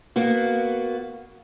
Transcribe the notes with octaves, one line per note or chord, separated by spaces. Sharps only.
A#3 B3 F#4